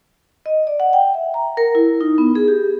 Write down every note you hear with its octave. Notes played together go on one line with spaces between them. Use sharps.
D#5
D5
F#5
G5
E5
A#5
A#4
E4
D#4
B3
G#4
G4